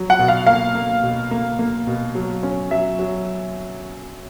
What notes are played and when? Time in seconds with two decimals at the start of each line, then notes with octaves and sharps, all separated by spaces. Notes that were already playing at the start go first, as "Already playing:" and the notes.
Already playing: F#3
0.10 F#5
0.19 B2
0.28 F5
0.47 A#3 F5
0.75 A#3
1.03 B2
1.31 A#3
1.59 A#3
1.87 B2
2.15 F#3
2.43 C#4
2.71 F#3 E5
2.99 F#3